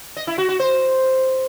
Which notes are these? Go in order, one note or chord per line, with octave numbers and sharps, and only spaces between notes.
D#5
E4
F#4
F#4
C5